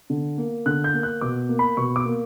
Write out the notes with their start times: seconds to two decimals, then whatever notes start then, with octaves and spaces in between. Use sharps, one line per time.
0.10 D3
0.38 A#3
0.66 D3 F#6
0.84 G6
0.94 A#3
1.03 F#6
1.21 B2 D6
1.49 A#3
1.59 B5
1.77 B2 C#6
1.96 D6
2.06 A#3